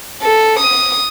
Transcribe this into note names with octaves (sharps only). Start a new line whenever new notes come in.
A4
D#6